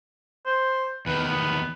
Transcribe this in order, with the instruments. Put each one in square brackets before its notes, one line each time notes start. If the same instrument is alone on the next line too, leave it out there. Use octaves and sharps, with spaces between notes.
[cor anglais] C5
[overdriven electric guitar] E2 D#3 [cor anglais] B4
[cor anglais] B3